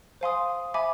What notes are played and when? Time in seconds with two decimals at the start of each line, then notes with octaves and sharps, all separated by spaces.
0.21 C5 F5 G#5 C6 D#6
0.74 E5 G#5 B5 D6